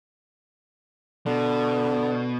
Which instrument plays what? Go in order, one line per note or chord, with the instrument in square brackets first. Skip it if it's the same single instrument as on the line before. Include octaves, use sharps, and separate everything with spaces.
[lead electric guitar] B2 [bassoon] D3